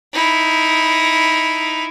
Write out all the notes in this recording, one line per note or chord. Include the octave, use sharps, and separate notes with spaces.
D#4 E4